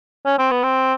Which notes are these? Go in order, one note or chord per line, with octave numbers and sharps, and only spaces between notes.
C#4
C4
B3
C4